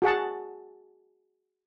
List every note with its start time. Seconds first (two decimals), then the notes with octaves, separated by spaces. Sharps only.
0.02 F#4 G#4 F#5 A5